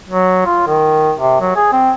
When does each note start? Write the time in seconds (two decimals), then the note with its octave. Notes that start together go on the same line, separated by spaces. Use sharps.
0.10 F#3
0.46 F4
0.67 D#3
1.19 C3
1.41 F#3
1.56 G#4
1.72 C4